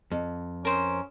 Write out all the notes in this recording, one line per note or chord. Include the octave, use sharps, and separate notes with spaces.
F2
C#4 A#4 C5 D#6